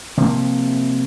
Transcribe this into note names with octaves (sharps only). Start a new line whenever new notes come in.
C3 F3 A#3